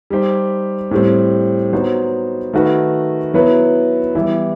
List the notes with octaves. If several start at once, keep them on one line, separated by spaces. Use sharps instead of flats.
G3 D#4 G4 C5
A2 G3 C4
F#3 B3 D#4 F#4 C5
D#3 A3 D#4 F#4 B4
F#3 B3 E4 B4
E3 G3 B3 E4 G4